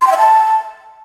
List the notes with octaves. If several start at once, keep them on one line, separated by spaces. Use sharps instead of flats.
C6
G5
E5
A5